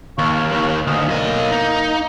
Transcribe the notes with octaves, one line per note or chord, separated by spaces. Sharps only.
D#2 C#5 F5 C#6
D#2
D2 D#5 F5
B1 A#3 D#5
D#4